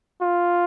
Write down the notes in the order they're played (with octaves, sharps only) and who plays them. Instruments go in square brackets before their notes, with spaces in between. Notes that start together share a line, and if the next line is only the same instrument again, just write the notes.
[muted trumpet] F4